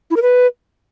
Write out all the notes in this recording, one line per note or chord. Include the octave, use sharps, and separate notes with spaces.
E4
A#4
B4